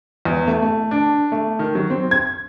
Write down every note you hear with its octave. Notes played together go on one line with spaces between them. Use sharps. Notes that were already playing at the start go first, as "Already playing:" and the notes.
E2
A3
A3
D4
A3
D#3
F#3
C4
G#6